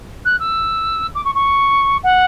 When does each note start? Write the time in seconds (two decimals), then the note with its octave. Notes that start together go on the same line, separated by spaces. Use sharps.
0.25 F#6
0.40 E6
1.15 D6
1.25 C#6
1.35 C#6
2.03 F#5